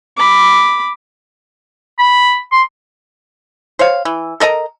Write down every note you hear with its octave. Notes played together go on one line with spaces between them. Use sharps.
B5 D6
B5
C6
C5 C#5 F5
E3
A4 A#4 D#5 A#5